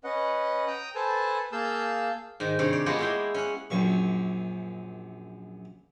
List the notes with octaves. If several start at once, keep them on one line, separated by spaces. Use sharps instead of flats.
C#4 B4 D#5 F#5
G5 A#5 D#6
A4 B4 C5 G#5 A5
A#3 G#4 F5 A5 E6 G6
G#2 D#3
G2 C3 C#5
D5
G#3 A#3 B3 F4 G4 C#5
G#3 E4 G5
C#4 F#5
A#1 F#2 C#6